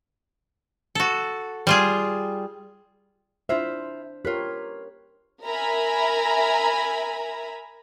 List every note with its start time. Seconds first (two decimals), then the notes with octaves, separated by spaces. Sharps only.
0.95 F#4 A4
1.67 G3 F4 G#4
3.49 D4 E4 F4 C5 E5
4.25 F4 G4 A#4 B4 C#5
5.46 A#4 E5 G#5 A#5 B5